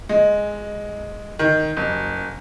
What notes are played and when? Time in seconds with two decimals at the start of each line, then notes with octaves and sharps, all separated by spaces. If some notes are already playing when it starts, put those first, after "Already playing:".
0.09 G#3
1.39 D#3
1.77 F#1